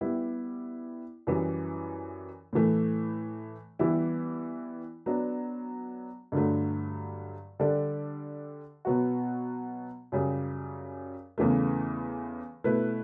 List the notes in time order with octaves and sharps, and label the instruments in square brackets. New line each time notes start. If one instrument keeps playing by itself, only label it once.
[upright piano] G3 B3 E4
F#2 E3 G3
A2 E3 A3
E3 G3 B3 E4
F#3 B3 D4
G2 D3 F#3 A3
D3 G3 D4 A4 D5
B2 F#3 B3 F#4
F#2 C#3 G3
E2 C#3 E3 A3
B2 A3 E4 B4